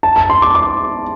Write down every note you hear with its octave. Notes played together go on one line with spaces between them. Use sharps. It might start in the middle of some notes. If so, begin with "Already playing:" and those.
A5
A5
C6
D6
D6